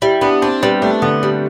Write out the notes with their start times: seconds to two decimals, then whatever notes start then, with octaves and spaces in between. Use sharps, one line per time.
0.02 G3 E4
0.21 B3 D4
0.42 C4 D4
0.62 G3 B3
0.82 A3 D4
1.02 D3 B3
1.23 G3